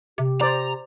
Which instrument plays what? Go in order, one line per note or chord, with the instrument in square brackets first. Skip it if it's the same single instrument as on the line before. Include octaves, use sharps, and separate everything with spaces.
[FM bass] C3 [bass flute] G4
[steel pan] C5 D5 [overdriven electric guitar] A#5